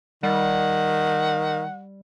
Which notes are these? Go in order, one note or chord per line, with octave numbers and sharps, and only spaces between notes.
D#3 G3 F#5